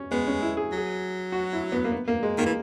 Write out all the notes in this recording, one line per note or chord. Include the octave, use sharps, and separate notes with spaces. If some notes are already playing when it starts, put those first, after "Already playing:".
Already playing: C#4
G#3 B3
C#4
E4
G#4
F#3 G#4
F#4
E4
B3
A#3
B3
A#3
G#3
D#3 A#3
E3